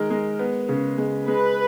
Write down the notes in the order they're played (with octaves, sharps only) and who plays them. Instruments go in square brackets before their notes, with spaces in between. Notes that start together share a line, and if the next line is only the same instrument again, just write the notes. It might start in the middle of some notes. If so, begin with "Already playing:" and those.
Already playing: [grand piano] D#3 G#3 A#4
G#3
B3
C#3
G#3
[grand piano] G#3 [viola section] B4